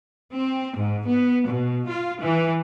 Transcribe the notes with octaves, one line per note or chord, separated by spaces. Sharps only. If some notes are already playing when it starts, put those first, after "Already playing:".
C4
G#2
B3
B2
F4
E3